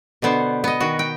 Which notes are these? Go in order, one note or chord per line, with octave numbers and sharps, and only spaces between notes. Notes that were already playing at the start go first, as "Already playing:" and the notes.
B2 D3 B3 C5
B3 D#5
D#3 F#4
G5